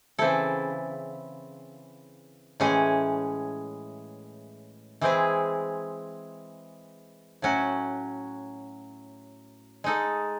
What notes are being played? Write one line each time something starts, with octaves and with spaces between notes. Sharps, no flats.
C#3 E3 C4 E4 A4
A2 E3 G#3 C#4 G#4
E3 G#3 C4 E4 G#4
A2 F#3 C#4 F#4
G#3 D#4 A4